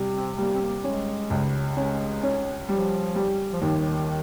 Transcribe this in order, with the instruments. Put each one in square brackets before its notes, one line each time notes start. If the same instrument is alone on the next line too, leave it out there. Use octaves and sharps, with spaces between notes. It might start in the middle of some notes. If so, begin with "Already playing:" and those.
Already playing: [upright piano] C3 G3
[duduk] C4
[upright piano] G3 [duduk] A#3
[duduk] C4
A#3
[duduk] G#3 [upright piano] C#4
[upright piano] C#2
[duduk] G#3 [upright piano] C#4
[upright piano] C#4
[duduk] F3 [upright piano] G3
[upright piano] G3
[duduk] F3
[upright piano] D#2 [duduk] D#3